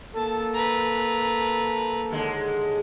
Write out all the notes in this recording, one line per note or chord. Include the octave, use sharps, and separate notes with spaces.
A#3 A4 A5
B4 A#5
D#2 D3 G#3